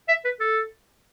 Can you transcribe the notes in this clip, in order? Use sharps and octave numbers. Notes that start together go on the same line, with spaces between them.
E5
B4
A4